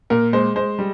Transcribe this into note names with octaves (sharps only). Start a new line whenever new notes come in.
A#2 A#4
G#3 C5
G#3 C5
G3